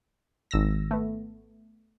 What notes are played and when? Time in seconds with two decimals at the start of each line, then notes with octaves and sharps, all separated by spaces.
0.51 G#1 E6 A#6
0.91 A3 B3